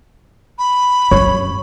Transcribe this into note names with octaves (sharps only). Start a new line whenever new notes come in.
B5
F#2 C#5